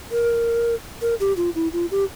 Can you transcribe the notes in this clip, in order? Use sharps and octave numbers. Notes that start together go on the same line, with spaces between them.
A#4
A#4
G4
F4
E4
F4
G4